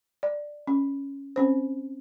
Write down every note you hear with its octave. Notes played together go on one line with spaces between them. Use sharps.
D5
C#4
C4 C#4 C5